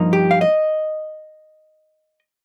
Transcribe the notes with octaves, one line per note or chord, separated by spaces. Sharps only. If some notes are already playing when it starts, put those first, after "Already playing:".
Already playing: G2 F3 A#3 D#4
G4
F5
D#5